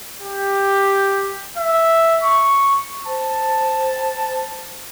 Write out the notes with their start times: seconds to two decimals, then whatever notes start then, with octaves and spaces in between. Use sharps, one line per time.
0.22 G4
1.58 E5
2.23 C#6
3.06 C5 A5